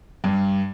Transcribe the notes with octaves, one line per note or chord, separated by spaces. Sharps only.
G2